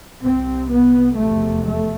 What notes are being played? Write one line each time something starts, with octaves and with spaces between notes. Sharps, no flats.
C2 C3 C4
B3
F1 E2 C3 A3
A3